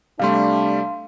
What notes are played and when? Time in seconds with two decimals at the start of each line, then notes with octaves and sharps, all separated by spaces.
0.19 C3 G3 A3 D4 F5 C6